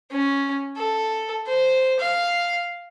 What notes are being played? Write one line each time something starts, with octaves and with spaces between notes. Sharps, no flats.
C#4
A4
C5
F5